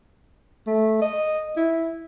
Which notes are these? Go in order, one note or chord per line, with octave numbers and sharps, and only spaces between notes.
A3
D#5
E4